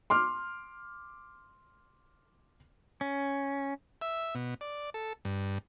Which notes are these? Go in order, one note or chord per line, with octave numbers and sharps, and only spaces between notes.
C6 D6 F6
C#4
E5
B2
D5
A4
G2